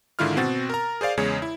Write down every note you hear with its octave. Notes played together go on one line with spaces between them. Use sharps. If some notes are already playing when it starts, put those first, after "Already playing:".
G#2 D3 D#3 E4 F4 F6
B2 C4 F#4 A6
A#4 A#5
G#4 C5 D5 F5
E2 C#3 G#3 C#5
E4